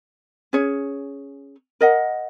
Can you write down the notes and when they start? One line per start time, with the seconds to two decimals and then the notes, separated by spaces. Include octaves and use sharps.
0.53 C#4 G#4 C#5
1.81 A#4 D#5 F#5